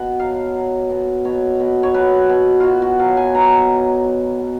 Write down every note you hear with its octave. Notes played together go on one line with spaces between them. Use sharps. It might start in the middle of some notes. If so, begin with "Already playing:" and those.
Already playing: B2 F#5
F#3 F5
F#3
B2
B2 C#5
B2
C#5
B2 B4
B2
B2 F4 F#4
F#4
F#3 F5
G#5
B2 A#5
F#3
F#3
B2